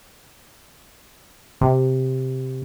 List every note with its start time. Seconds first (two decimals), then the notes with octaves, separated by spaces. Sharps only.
1.61 C3